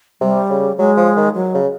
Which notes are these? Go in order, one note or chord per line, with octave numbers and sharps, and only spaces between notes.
C3 G3
C#3
F#3 G#3
F3
D#3
F#3
C#3